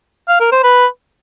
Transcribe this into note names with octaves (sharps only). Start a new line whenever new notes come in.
F5
A#4
C5
B4